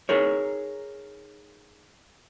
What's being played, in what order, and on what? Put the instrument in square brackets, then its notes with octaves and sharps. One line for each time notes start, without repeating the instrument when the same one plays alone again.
[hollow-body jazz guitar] D#4 G#4 A#4 C#5